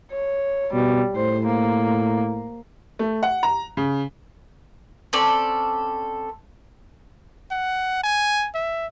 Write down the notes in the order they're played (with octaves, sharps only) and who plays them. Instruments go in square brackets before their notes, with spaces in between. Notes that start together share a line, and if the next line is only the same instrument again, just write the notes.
[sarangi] C#5
[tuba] B2 [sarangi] G3
[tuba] A2 [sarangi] C5
[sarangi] A#3
[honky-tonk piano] A3
F#5
A#5
C#3
[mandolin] C4 C#4 A4 D5
[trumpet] F#5
G#5
E5